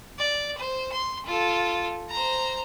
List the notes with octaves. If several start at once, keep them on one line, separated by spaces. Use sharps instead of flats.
D5
C5
C6
F4 A4
C5 A#5